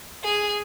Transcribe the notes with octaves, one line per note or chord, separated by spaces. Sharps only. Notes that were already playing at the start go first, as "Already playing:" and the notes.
G#4